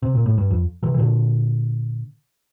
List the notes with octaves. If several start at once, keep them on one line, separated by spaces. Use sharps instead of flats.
C3
A#2
A2
G2
F2
C3 E3
E3
A#2 D3